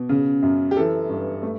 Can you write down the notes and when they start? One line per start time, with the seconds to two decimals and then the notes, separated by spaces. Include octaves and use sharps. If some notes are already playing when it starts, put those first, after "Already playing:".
Already playing: B2
0.09 C#3
0.43 F#2
0.71 G4
0.77 E3 A4
1.09 G2
1.43 A3